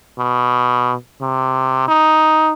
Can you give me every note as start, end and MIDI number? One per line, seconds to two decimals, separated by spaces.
0.19 0.94 47
1.21 1.87 48
1.88 2.52 63